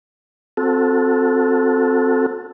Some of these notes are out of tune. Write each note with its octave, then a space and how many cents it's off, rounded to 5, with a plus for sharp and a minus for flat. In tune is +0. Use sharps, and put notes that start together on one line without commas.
C4 +0 F#4 -30 A4 +0